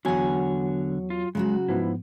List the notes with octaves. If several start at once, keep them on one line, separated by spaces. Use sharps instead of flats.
E2 D3 F#3 B3 F#4 F#5 G#5
F4
C#3 F#3 G#3 F#4
G#2 F3 B3 E4